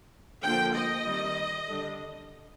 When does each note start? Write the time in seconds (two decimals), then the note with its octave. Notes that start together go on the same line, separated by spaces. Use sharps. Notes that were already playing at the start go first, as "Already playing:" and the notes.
0.43 D3 F3 A#3 G5
0.74 D#5
1.05 D#3 G3 C4
1.67 D3 G3 D4